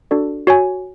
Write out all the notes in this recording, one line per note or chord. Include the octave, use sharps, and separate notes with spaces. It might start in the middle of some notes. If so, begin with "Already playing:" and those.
D4 F#4 A4 D5
F#4 C#5 G#5